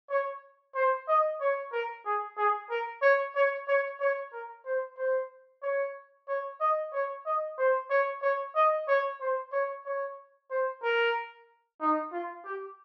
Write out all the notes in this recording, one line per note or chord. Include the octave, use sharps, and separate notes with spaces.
C#5
C5
D#5
C#5
A#4
G#4
G#4
A#4
C#5
C#5
C#5
C#5
A#4
C5
C5
C#5
C#5
D#5
C#5
D#5
C5
C#5
C#5
D#5
C#5
C5
C#5
C#5
C5
A#4
D#4
F4
G4